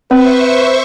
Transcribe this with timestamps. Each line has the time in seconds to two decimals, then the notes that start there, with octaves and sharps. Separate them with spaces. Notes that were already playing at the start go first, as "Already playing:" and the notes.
0.11 C4 B4 C5 E5 C#6